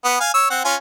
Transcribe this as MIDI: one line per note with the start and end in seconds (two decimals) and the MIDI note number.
0.05 0.20 59
0.20 0.32 77
0.20 0.32 80
0.34 0.47 73
0.34 0.47 88
0.50 0.61 60
0.50 0.61 78
0.65 0.75 61
0.65 0.75 65
0.65 0.75 80